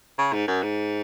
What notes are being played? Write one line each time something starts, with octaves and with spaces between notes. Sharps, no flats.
C#3
G#2
F#2
G#2